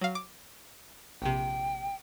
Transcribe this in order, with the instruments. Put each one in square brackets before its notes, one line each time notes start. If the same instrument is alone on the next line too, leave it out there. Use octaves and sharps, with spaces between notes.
[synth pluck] F#3 F5
D6
[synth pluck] A#1 C3 [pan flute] G5